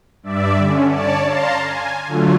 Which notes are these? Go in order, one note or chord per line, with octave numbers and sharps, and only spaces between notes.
G2 D5 E5
D3 C#4
C#5 D5 A5
F5 A5 A#5 C6
G#5
D3 F#3 A3 F4